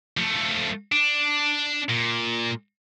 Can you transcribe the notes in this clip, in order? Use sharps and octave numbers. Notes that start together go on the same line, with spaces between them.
F3 A3
D4
A#2